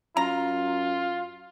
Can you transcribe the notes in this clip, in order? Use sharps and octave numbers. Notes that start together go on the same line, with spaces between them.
F#2 F4 A#5